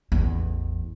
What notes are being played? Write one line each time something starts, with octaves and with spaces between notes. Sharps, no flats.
A1 E2